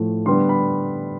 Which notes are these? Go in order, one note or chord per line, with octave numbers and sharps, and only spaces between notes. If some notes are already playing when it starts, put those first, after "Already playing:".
Already playing: A2 F3 A3
D3 G3 B3 C6
B5